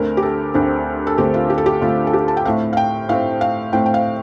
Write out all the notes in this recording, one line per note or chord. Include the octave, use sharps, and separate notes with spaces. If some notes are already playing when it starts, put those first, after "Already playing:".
Already playing: D2 D3 A3 C4 A#4
G4
A4
D2 D3 A3 C4
A4
D2 D3 A3 C4 G4
F4
G4
A4
G4
D2 D3 A3 C4 F4
A4
G4
A5
G5
A2 A3 C4 F5
F5
G5
A2 A3 C4 F5
F5
A2 A3 C4 G5
G5
F5